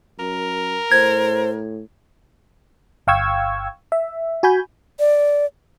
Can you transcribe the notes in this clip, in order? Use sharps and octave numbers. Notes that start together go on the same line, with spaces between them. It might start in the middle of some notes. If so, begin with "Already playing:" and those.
F#2 A#4
A2 C5 G#6
G1 F5 G5 C#6 E6 G#6
E5
F#4 G#5 B5 G6
D5